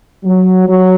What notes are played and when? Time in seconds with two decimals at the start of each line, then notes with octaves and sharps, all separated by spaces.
0.24 F#3
0.67 F#3